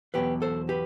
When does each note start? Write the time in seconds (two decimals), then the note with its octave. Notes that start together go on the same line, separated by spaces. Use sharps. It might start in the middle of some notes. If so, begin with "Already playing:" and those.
0.14 E2 B2 F#3 G4 B4
0.42 A4 C5
0.69 G4 B4